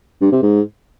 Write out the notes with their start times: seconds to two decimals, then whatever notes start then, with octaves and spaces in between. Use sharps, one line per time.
0.21 G2
0.32 C3
0.42 G#2